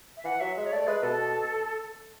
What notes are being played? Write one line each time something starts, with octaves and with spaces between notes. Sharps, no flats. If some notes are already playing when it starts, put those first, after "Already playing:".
E5
E3 F#5
F#3 E5
G#3 E5
C#5
A3 D5
G#3 B4
B2 A4